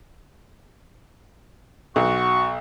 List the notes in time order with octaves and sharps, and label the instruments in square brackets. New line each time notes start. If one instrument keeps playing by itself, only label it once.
[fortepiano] B1 [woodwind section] F#4 C#6